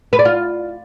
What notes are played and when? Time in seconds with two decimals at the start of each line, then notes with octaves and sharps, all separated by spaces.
0.13 B4
0.19 D5
0.25 F4